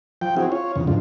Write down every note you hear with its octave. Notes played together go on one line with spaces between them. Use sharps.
F3 G5
C4 E4 F#4 G#4
F4 C#5
E2 C#3
G#2 D3 F3